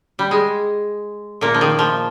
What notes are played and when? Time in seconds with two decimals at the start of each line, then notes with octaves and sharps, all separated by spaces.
0.19 G3
0.31 G#3
1.41 A#2 A#3
1.54 F3
1.61 D#3
1.79 F3